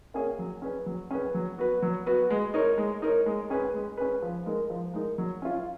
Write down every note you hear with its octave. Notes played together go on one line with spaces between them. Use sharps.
A#3 C#4 G#4 C#5
F#3
C#4 G#4 B4
F#3
C#4 G#4 B4
F#3
B3 F#4 B4
F#3
B3 F#4 B4
G#3
D#4 A#4 C#5
G#3
D#4 A#4 C#5
G#3
C#4 G#4 B4
G#3
C#4 G#4 B4
F3
G#3 D#4 A#4
F3
G#3 D#4 A#4
F#3
C#4 F4